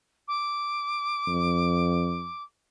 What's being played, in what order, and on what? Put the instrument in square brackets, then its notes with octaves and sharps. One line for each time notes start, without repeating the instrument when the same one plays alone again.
[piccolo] D6
[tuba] F2